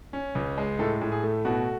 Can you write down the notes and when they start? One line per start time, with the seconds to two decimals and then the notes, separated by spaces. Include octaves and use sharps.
0.13 C#4
0.35 C#2
0.58 G#3
0.79 A2 A4
1.01 A2
1.12 G#4
1.23 A3
1.45 B2 F#4